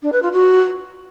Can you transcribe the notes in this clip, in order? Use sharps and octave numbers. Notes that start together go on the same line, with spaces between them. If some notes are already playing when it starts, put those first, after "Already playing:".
D4
B4
F4
F#4